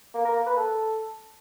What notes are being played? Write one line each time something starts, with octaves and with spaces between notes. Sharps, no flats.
A#3
A#4
A#3
B4
A4